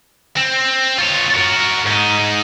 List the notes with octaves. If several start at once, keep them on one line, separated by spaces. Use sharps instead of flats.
C4
F4 C#5
F#4 A#4
G#2 D#4